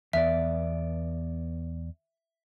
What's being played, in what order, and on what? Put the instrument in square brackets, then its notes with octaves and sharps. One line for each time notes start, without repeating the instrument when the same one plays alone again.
[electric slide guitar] E2 B3 D5 [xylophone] E5